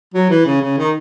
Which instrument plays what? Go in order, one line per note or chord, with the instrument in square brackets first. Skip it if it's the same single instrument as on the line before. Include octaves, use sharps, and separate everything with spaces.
[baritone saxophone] F#3
E3
C#3
C#3
D#3